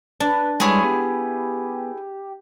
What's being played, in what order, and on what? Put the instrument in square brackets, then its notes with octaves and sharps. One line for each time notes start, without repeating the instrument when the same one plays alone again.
[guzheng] D4 [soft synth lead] B4
[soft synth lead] G3 [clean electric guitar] G#3 B4 C#5 [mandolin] E4 G#4
[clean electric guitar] B3 [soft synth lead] G4